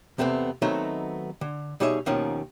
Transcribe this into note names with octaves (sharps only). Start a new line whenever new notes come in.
E2 C3 A3 B3 C4
D#3 F#3 A3 B3 C4 D#4
D3
B2 G3 D#4 G#4 C#5 E5
D#2 B2 D#3 F3 C#4